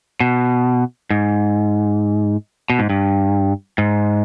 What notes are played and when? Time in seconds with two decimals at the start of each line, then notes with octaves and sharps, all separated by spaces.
0.20 B2
1.10 G#2
2.70 B2
2.79 G#2
2.90 G2
3.78 G#2